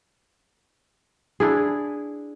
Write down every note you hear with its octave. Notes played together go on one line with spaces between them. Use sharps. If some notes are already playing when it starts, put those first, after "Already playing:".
D4 E4 G#4